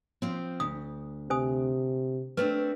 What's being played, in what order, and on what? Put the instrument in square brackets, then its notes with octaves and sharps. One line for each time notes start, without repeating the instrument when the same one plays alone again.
[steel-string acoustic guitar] F3 C4
[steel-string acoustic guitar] D2 [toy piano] D#6
[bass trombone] C3 [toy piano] C5 G#5 D#6
[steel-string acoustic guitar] A3 C4 D4 [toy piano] B4